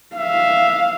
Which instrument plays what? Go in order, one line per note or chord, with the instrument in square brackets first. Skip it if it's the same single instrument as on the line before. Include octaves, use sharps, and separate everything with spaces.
[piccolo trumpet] E5 [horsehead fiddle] F5